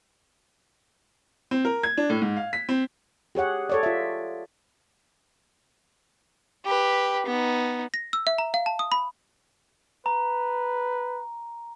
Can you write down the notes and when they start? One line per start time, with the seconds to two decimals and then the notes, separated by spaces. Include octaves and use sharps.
1.51 C4
1.65 A#4
1.83 G#6
1.98 D4
2.09 A2
2.22 G#2
2.37 F5
2.53 B6
2.69 C4
3.35 G4 G#4 C#5 F#5
3.69 A4 C#5 D5
3.83 F4 E5
6.65 G4 B4
7.26 B3 D#4
7.94 A#6
8.13 E6
8.27 E5
8.38 A#5
8.54 F5
8.66 A5
8.79 D#6
8.92 B5
10.06 B4 A#5